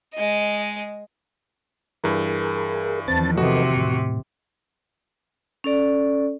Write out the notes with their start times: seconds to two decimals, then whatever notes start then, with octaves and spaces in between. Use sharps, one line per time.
0.14 G#3 D#5
2.04 G2 E3 G#4 A#4
3.08 E2 D#3 F3 C4 A5 A6
3.37 C3 F#4 A4 B4 D#5
3.77 A2
5.64 C#4 A4 D5